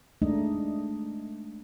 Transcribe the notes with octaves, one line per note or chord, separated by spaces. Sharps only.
G#3 A3 D4 D#4 D#5